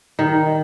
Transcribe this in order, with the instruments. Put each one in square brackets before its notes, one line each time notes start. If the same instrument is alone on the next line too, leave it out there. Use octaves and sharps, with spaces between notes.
[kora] D#3